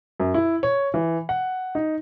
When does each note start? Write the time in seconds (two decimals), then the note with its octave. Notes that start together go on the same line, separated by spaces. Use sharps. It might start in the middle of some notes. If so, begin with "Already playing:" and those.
0.20 F#2
0.34 E4
0.63 C#5
0.94 E3
1.29 F#5
1.75 D#4